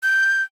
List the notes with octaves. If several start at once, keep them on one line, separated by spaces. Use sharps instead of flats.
G6